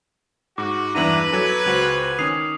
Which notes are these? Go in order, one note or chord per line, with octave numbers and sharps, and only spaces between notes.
G#2 F#4 D6
E2 G2 D4 E4 B4 A#5 D#7 F#7
F#3 A4 G#5
C#2 F#4 C5 F7 F#7
D#3 C#4 D#6 C7 F7